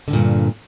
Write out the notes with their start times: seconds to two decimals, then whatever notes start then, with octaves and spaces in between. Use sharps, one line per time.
0.08 D3
0.11 D#3
0.13 A#2
0.16 G2